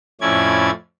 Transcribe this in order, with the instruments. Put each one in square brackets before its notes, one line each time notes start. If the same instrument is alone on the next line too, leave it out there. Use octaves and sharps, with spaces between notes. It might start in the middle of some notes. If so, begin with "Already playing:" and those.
[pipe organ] F2 A2 C#4 E4 D5 G#6